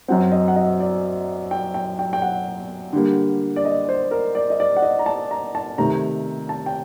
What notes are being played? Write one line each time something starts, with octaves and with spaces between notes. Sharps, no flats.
F#2 F#3 C4 F#5
D#5
F#5
D#5
D5
G5
G5
G5
G5
F#5
D3 G3 A#3
D5
D#5
C5
A#4
D5
D#5
D5
F#5
D#5
A#5
A5
A#5
A5
C3 D#3 A3 A#5
A5
G5